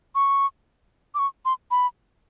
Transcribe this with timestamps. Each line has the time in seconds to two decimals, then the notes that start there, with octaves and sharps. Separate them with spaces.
0.15 C#6
1.15 D6
1.19 C#6
1.45 C6
1.71 B5